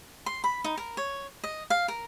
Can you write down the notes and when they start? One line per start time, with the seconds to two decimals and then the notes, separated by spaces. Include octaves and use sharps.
0.26 C6
0.44 B5
0.64 D#4
0.77 A#4
0.97 C#5
1.44 D#5
1.70 F5
1.88 A#4